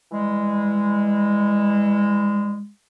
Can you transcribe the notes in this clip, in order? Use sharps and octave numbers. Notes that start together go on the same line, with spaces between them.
E3 G3 G#3